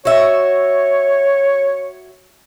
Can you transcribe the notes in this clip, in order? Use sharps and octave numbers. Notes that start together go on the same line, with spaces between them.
F#4 C#5 E5